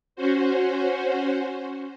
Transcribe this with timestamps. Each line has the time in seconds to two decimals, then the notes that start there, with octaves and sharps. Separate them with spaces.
0.16 C#4 F#4 C5